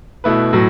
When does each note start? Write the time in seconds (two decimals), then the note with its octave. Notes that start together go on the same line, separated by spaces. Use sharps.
0.24 B2 A3 E4 B4
0.53 A2 F#3